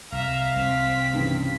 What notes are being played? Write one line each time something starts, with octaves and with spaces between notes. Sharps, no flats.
C2 E5 F5 A#5
C2 C4 B6
G2 C#3 E3